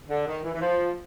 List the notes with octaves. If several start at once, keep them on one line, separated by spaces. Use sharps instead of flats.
D3
D#3
E3
E3
F3